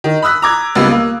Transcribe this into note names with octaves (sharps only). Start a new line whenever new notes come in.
D#3
B5 D#6 E6 F#6 B6
A#5 D6 G#6
C#2 G3 A#3 B3 B4 E6
A#3